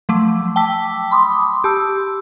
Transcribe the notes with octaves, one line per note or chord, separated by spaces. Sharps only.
F3 F#3 A3 D6
G5 A5 D6 E6 B6
B5 C6 D6 D#6
G4 A5 E6